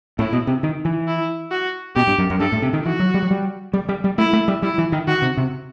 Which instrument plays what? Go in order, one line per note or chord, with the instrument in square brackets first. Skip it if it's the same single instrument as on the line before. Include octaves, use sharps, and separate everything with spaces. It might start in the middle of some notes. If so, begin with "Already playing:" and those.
[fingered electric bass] A2 [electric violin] E4
[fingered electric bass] B2
C3
D#3
E3
[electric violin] E4
F#4
[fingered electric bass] B2 [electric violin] G4
[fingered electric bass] G2
F#2
F#2
[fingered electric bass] G2 [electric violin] A4
[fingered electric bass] A2
C3
D#3
[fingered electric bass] E3 [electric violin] F#4
[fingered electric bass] F#3
G3
F#3
G3
G3
G3
G3
[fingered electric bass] A3 [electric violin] E4
[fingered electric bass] A3
G3
[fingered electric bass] G3 [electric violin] E4
[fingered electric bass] E3
D#3
[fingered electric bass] D#3 [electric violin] F#4
[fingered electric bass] C3
C3